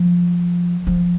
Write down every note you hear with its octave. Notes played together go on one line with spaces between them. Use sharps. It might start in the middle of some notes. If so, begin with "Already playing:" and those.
Already playing: F3
F3